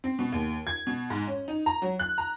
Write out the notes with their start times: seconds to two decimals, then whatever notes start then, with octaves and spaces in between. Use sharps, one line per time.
0.04 C4
0.19 B2
0.32 D#2
0.67 G#6
0.87 B2
1.10 G#2
1.27 C#4
1.48 D#4
1.66 A#5
1.82 F#3
1.99 F#6
2.18 A#5